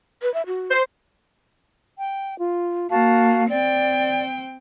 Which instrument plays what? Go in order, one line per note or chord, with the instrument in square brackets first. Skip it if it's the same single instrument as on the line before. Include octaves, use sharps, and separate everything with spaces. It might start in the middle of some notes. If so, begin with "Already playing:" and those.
[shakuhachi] B4
E5
F#4
[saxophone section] C5
[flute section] G5
F4
[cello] A#3 [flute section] F#4 F5 A5
[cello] C4 G5 [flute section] D5